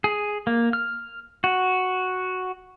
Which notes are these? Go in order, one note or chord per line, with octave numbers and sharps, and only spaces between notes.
G#4
A#3
F6
F#4